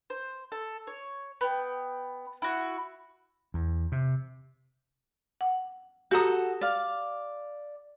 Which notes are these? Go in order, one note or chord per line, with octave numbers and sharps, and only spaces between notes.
C5
A4
C#5
B3 G5
E4 F#4
E2
C3
F#5
F#4 G4 A4 A#5 D#6
D5 F5